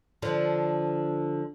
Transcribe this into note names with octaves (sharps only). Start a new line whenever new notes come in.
D3 F3